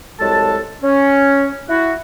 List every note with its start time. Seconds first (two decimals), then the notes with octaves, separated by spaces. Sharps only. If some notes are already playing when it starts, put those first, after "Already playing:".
0.20 C2 F#3 G#3 A4 A5
0.83 C#4
1.69 E4 F#4